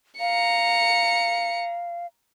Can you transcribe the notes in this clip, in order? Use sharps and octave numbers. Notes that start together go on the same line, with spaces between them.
F5 A#5 C#7